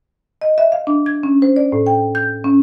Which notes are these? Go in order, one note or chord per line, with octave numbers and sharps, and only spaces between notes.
D#5
E5
F5
D4
G#6
C#4
C5
D5
A2
G5
G6
C#4